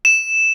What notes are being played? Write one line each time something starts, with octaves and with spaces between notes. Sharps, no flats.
E7